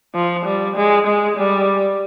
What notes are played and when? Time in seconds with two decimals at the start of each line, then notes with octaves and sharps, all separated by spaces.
0.15 F3
0.46 G3
0.76 G#3
1.07 G#3
1.37 G3